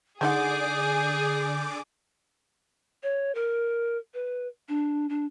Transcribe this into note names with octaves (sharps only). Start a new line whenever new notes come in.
D3 G#3 D#4 G#4 D5 F#5 D6 G6
C#5
A#4
B4
D4
D4